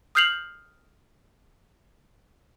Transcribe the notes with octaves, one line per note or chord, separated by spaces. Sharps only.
D#6 F6 G6 C7 F7 F#7